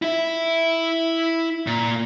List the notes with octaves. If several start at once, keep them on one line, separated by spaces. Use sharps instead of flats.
E4 E5
A#2